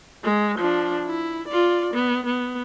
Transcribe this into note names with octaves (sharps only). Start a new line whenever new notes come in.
G#3
F3 D4
E4
F4 D5
B3
B3